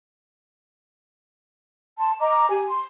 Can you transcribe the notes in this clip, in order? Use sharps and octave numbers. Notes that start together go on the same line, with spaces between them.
A5 C6
D#5 A#5 D6
G4 G#5
C6